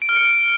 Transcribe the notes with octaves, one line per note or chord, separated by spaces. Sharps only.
D7
F6
C#7